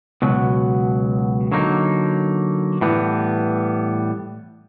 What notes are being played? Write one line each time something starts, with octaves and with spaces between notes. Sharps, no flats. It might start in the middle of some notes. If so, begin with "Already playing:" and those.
C#2 B2 F#3
D3 F#3 A#3 D#4
A2 E3 G3 B3